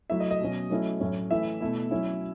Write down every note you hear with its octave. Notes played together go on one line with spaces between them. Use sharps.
F#3 A3 E4 E5
D#5
D#5
B2 F#3 C#4
F#3 A3 C#4 E4
A2 F#3 C#4
E3 A3 E4 E5
B2 A3 E4
F#3 C#4 E4